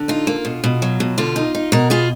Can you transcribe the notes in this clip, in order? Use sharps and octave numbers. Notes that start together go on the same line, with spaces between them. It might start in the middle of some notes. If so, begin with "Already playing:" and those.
Already playing: D3
D#4 F4
A#3
B2
B2
F#3
B2
D3 F4
D#4
D#4
B2 F#4 A#4
B3 F4 G#4